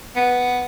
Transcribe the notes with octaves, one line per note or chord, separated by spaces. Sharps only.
B3